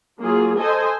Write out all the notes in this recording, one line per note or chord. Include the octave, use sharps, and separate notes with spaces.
F#3 A#3 F4 G#4
A4 C5 D#5 G#5